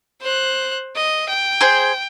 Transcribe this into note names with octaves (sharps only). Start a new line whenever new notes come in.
C5 F#6
D#5
G5
G#4 C5